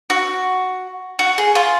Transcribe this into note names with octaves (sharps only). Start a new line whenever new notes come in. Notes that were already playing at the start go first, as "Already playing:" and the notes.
F#4
F#4
G#4
F4